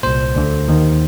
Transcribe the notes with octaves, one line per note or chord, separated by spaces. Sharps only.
C2 A#2 C5
D2 D3
D#2 D#3